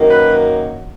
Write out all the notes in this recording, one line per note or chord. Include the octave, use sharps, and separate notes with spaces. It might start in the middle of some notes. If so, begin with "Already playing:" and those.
Already playing: F#2 D#3 F#3 A#3
B4